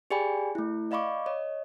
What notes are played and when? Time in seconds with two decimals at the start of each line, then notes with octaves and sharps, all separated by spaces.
0.10 G4 G#4 D5 G5 G#5 B5
0.55 A3 E4
0.91 D5 D#5 F5 B5 C#6 D6
1.26 C#5 D#5